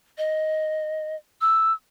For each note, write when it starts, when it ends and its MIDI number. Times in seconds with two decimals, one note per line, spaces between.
0.18 1.16 75
1.41 1.73 88